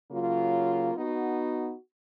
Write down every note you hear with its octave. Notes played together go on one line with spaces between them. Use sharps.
C#3 F#3 A#3 F4
B3 D#4 F#4